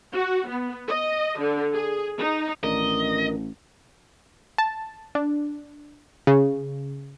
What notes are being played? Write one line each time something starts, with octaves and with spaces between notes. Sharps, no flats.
F#4
B3
D#5
D3
G#4
D#4
A1 D#3 D4 A#4 D#5
A5
D4
C#3